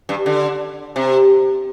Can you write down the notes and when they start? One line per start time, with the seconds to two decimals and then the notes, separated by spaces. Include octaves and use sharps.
0.09 G2
0.26 D3
0.96 C3